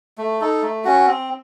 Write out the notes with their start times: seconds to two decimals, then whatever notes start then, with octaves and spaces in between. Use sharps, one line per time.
0.18 A3
0.41 D#4 A4
0.62 A3
0.84 C#4 F#4
1.08 C4